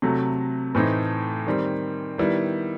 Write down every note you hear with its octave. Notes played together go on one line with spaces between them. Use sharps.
C3 F#3 A3
A2 E3 A3 C4 D#4
D#3 G3 C4
D#3 G3 B3 E4